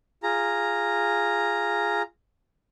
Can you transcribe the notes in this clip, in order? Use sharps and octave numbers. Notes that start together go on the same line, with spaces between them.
F4 G#4 A#5